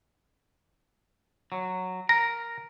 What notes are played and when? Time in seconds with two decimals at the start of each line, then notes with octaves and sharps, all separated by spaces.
1.52 F#3
2.09 A#4 A#5